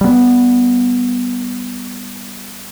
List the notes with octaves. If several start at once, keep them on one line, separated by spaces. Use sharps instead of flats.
G3 B3